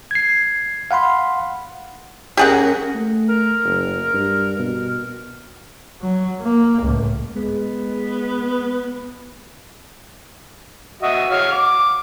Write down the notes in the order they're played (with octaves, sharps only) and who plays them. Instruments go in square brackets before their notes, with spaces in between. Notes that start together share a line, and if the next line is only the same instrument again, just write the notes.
[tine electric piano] G#6 C7
F5 F#5 B5 C6
[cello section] C#4 A#4 [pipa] G4 G#4 F#5
[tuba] A3
[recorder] A#4
[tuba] F#1
G2
B2
[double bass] F#3
A#3
C#2 A2
[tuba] G#3 [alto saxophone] B3
[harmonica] F#4 D#5 E5
F#4 C#5 F5
D6